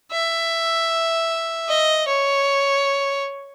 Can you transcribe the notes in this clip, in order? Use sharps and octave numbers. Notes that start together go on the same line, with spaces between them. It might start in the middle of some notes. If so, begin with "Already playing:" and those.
E5
D#5
C#5